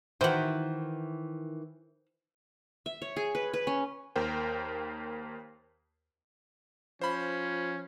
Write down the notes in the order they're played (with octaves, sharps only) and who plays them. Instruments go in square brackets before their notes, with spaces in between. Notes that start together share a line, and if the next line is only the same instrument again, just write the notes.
[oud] D#3 E3 E4 [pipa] F#4 C5
[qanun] E5
C#5
G#4
B4
B4
C#4
[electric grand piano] D#2 A#4 C5 G5
[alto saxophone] F3 [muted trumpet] C#4 [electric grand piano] C5 B5